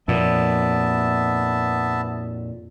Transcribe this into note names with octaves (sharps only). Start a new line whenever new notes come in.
F2 A#2 B3 E5 A5